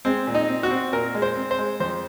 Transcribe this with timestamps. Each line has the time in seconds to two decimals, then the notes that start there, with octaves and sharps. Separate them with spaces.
0.05 G#3 C4
0.27 A#2
0.35 D#4
0.48 C4
0.63 F#4
0.71 C4
0.93 A#2 A#4
1.14 G#3
1.22 C5
1.36 C4
1.51 C5
1.58 G#3
1.80 F2 C5